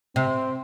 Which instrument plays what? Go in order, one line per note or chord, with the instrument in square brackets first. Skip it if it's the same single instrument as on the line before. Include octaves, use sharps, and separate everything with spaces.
[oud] C3 [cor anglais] C4